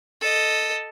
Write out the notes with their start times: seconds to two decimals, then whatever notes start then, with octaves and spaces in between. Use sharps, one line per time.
0.21 A4 D#5